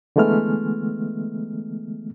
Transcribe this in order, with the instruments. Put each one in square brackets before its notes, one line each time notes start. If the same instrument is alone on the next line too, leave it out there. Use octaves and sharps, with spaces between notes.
[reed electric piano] D3 E3 G#3 A3 B3 F6